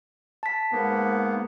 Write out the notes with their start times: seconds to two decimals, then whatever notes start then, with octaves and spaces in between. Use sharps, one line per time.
0.43 A5 B6
0.72 G#2 A#3 B3